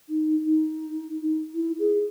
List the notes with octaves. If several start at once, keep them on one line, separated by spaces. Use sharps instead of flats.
D#4
D#4
E4
G#4